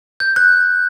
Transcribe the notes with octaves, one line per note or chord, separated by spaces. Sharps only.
G6
F#6